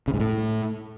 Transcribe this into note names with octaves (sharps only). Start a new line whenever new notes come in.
C#3
G#2
A2